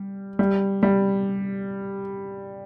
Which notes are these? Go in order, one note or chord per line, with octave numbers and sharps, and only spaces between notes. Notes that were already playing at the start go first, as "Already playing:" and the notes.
Already playing: G3
G3
G3